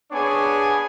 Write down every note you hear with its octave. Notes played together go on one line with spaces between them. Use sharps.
B3 D4 G#4 C#5 G#5